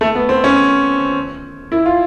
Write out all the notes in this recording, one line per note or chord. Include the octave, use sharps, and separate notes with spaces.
A3
B3
C4
C#4
E4
F4